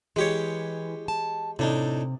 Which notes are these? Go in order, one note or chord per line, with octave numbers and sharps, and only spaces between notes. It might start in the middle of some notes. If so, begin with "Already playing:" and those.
E3 G#3 G4 C#5
A5
A2 C3 D4 D#4